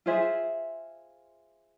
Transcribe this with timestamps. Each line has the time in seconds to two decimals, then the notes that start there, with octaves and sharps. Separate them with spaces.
0.06 F4 G#4 C5 E5